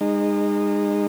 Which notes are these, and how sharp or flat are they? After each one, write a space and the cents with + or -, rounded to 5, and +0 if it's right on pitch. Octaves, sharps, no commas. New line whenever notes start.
G#3 -30 D#4 -25